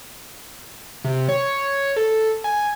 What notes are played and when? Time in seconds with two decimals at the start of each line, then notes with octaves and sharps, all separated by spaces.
1.05 C3
1.29 C#5
1.96 A4
2.44 G#5